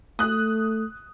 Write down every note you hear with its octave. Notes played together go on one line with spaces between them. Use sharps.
A3 D#6 F#6